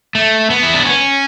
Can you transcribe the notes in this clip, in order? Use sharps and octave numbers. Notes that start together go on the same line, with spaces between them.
A3
B3
E4
D4
C#4